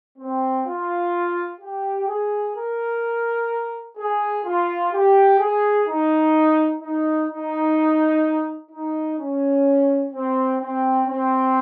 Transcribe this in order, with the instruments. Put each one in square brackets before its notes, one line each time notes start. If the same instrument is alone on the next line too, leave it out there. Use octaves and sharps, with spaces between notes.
[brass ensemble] C4
F4
G4
G#4
A#4
G#4
F4
G4
G#4
D#4
D#4
D#4
D#4
C#4
C4
C4
C4